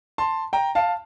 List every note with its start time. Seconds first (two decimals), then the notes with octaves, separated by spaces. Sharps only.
0.18 A5 C6
0.53 G5 A#5
0.75 F5 A5